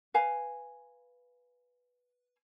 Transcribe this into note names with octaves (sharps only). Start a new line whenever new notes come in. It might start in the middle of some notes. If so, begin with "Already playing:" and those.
B4 F5 G#5